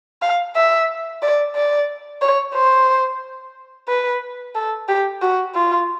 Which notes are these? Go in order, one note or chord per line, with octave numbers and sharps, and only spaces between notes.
F5
E5
D5
D5
C#5
C5
B4
A4
G4
F#4
F4